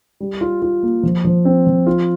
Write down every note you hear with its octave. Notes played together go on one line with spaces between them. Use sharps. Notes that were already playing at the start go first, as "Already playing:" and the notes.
G3
F4
F4
A#3
F3
F3
C4
F3
F4